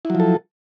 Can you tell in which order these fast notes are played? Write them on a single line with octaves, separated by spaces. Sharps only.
E4 F#3 F3 A4